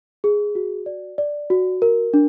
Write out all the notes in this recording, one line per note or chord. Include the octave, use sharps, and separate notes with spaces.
G#4
F#4
D5
D5
F#4
A#4
D4